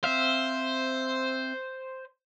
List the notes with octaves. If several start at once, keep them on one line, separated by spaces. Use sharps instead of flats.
C4 C5 E5 F5